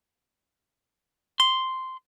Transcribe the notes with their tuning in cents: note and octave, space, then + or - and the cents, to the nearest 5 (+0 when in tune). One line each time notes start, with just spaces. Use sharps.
C6 -5